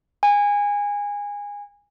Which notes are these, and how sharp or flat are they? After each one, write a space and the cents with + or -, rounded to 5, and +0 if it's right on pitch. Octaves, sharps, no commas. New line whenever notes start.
G#5 -20